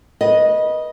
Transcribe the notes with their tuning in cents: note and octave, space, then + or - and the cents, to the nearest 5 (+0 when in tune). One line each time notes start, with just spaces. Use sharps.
B4 -25 D#5 +0